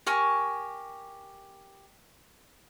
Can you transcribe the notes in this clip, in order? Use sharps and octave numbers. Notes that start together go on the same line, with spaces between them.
G4 A#4 G#5 C#6